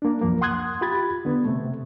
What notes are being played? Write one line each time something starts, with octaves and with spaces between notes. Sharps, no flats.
A#3 D4
C2 F#2 F3 A#3
F#5 C6 D#6 F#6 G#6
F4 G4 B5 G#6 A6
D3 B3
C3 A3